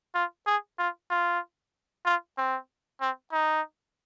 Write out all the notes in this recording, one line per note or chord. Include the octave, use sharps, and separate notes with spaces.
F4
G#4
F4
F4
F4
C4
C4
D#4